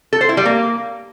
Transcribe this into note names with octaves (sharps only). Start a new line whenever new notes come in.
A4
C5
E4
G3
A#3